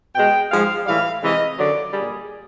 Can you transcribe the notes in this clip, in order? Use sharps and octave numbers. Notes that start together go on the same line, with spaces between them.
B2 G#3 G5
G#2 F3 G#3 F5
A2 E3 G3 F5
C3 E3 G#3 D#5
F#2 D3 F#3 D5
A#2 G3 G#4